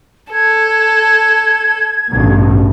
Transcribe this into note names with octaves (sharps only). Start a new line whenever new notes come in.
A4 G#6
A1 G2 B2